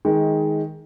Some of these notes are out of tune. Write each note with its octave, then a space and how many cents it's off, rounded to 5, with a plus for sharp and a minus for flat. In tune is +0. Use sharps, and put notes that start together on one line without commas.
D#3 +20 G#3 +10